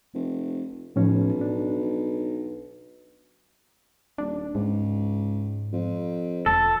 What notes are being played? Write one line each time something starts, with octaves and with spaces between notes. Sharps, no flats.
F1
B1 A2 F3 C#4
D4
D#1 D4
C#2 G#2
F2
E1 A4